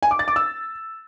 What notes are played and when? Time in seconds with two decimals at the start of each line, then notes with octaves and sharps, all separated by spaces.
0.03 G#5
0.11 D6
0.19 A6
0.28 D6
0.36 E6